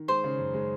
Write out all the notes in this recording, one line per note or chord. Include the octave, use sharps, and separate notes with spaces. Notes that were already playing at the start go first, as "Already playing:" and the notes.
Already playing: D#3
G#3 C5
C#3
F#2
G#3